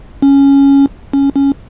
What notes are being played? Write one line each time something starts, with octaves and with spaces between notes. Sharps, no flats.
C#4
C#4
C#4